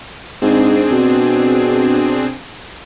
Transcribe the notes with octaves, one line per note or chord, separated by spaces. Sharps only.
G#2 C4 D4 G#4
B2